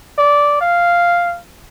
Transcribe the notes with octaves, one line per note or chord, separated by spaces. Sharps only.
D5
F5